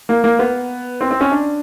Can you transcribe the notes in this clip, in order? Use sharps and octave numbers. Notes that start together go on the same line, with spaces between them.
A#3
A#3
B3
C4
C4
C#4
D4